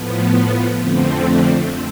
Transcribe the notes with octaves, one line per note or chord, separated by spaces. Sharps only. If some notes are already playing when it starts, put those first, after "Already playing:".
Already playing: A2 F3 B3
F2 D3 F3 A3 C4